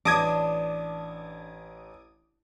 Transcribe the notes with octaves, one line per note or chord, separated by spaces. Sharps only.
A1 D4 A5 D6 D#6 G#6 A#6